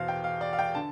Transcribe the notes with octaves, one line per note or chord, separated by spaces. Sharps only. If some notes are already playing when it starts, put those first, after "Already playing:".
Already playing: E2 B2 C5 F5
G5
F5
D5
F5
G5
D3 A5